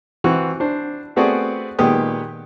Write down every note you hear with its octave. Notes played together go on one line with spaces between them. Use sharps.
E3 C4 F#4
D4 C5
A3 B3 C4 F#4 G#4 D5
A#2 D#3 G#3 B3 G4 D#6